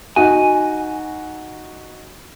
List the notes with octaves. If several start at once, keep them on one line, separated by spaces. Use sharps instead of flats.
D#4 F#4 G#5